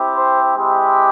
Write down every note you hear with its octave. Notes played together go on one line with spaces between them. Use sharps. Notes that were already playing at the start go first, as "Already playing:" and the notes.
Already playing: C4 E4 G4
C5
G#3 C4 E4 G4